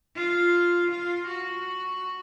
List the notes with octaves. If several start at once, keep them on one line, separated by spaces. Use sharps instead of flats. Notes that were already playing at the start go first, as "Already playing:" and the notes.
F4
F4
F#4